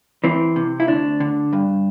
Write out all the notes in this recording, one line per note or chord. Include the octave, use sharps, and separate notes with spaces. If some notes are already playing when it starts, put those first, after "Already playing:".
E3 C4
C3
E4
D2 D4
D3
G2